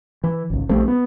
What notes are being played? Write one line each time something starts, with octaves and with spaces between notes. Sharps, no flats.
E3
G#1 C#2
A#1 G3 A3 C4
B3